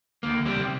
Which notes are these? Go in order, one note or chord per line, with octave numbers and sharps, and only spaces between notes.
D2 A#3
D2
G3 C4
C3